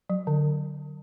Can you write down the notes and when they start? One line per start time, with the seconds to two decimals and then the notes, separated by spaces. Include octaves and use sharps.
0.10 F#3
0.27 D3